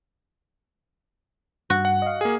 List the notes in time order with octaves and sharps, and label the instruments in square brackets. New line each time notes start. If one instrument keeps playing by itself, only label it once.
[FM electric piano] G2 [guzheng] F#4
[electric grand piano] F#5
[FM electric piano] D#5 F5
[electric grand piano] A#3 G#4